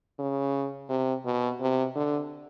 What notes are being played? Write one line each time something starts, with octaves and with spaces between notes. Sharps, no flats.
C#3
C3
B2
C3
D3